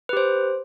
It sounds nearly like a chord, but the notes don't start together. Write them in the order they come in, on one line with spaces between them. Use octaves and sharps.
B4 G4 C5